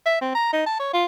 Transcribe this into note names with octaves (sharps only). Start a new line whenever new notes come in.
E5
C4
A#5
D#4
A5
C#5
F4